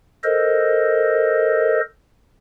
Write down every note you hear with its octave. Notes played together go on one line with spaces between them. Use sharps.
A4 A#4 C5 D#5